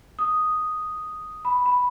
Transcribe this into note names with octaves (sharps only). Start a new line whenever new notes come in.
D#6
B5
B5